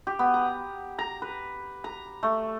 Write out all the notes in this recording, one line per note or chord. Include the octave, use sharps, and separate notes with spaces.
G4
B3
A#5
A#5
B4
A#5
A3